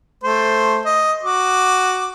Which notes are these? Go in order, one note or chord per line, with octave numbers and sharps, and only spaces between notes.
A3 C5
D#5
F#4 D6